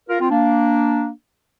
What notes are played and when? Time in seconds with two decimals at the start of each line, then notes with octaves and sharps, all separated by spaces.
0.09 F4 A#4
0.20 C4 F4
0.30 A#3 D4